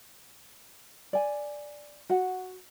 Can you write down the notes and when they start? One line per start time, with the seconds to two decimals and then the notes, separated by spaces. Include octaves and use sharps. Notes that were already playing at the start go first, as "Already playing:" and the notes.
1.13 D5 G#5
2.09 F#4 F#5